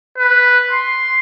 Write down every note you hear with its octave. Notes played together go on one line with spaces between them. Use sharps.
B4
C6